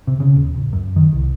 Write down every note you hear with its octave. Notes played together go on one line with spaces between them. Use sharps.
C3
C#3
D#1
D1
F#2
D#3
C2